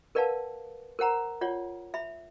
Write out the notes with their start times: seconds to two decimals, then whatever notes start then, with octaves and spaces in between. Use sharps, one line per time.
0.15 A#4 B4 D5 F5 F#5 A5
0.99 A#4 C5 F#5 A#5
1.41 F4 C#5 D5 F#5
1.94 E5 B5